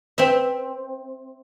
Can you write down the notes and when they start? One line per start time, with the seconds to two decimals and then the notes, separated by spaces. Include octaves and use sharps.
0.18 C4 E5